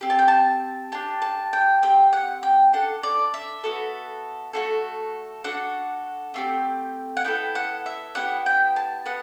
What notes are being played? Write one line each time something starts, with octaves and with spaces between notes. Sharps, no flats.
C4 G4
A5
G5
A5
D4 G4 A5
A5
G5
C4 G4 G5
F#5
G5
D4 A4 F#5
D5
E5
B3 F#4 A4
A3 D4 F#4 A4
D4 F#4 A4 F#5
A3 C4 G4
F#5
B3 E4 A4 G5
F#5
E5
B3 E4 G4 F#5
G5
A5
B3 F#5